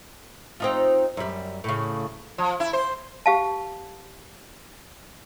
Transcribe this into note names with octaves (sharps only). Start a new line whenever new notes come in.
C4 D#4 F4
F#2 G3
A2 C#3
F3
E4
C5
G4 F5 A5